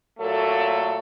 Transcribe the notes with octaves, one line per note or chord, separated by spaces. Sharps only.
A#2 F#3 A3 A#3 A4